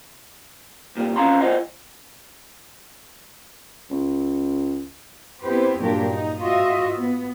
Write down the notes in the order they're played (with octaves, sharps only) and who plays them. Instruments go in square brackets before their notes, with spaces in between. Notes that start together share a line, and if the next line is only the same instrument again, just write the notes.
[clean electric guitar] C2 A#2 G3
F2 F3 C#4 F5 A#5 C6
F4 C5 D5 D#5 F#5
[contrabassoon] C#2
[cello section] B3 C4 E4 G4 B4 C5
G2 A#2 F#3 D4 G4 A#4
D#4
G#2 F4 F#4 D#5 E5
B3